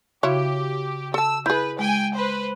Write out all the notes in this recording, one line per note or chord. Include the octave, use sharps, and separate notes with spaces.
C#3 E4 F#4 G4 C#5 F5
A4 A5 E6
E4 G#4 B4 G6
G#3 G5 G#5
B4 C5